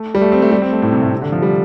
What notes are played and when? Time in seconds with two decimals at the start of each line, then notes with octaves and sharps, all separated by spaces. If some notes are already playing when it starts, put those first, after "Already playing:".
Already playing: A3
0.15 G3
0.21 A3
0.32 C4
0.42 A3
0.51 G3
0.62 C4
0.72 A3
0.82 A2
0.92 C3
1.02 A2
1.13 C3
1.22 D3
1.32 F3
1.42 G3